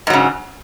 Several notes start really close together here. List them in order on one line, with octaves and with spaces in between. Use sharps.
G#2 F#3 C#3